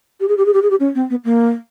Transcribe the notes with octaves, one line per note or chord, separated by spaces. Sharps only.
G4
G#4
G4
G#4
G4
G#4
G4
C#4
C4
B3
A#3